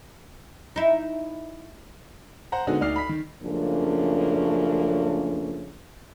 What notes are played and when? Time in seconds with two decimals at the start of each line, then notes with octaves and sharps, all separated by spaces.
0.76 D#4 E4
2.52 C5 F#5 A#5
2.67 D3 G#3 B3 D#4 F#4
2.81 D2 D#4 D5 F6 C7
2.96 B5 B6
3.09 D#3
3.42 F#2 C#3 F3 A3 A#3 D4